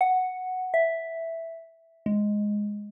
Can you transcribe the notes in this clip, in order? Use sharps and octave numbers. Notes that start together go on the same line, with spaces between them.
F#5
E5
G#3